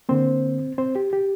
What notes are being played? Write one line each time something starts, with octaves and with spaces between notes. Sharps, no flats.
D3 A#3 C4 C5
C4 C5
G4
G4